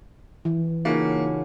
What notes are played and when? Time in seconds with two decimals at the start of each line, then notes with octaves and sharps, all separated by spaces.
0.45 E3
0.85 C#3 A#3 D#4 F4 F#4